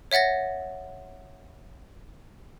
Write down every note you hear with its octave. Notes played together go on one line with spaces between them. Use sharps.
C#5 E5 F#5 A6 A#6